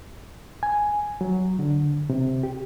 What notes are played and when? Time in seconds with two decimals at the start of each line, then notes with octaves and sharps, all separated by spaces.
0.63 G#5
1.21 F#3
1.59 D3
2.10 C3
2.43 G4